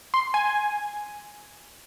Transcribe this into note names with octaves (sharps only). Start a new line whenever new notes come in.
C6
G#5